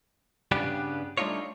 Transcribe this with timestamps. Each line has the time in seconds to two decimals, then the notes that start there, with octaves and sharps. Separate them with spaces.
0.51 G2 C#3 G3 B3 D4 G4
1.18 G3 A3 D4 D#4 F4 C#5